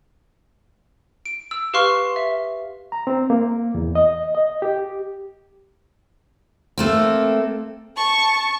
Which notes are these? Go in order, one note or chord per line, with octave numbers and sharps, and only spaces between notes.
D7
E6
G4 B4 F5 C6 C#6 F6
E5
A#5
C4
A#3
E2
D#5
D#5
G4
A3 A#3 C4
A5 C#6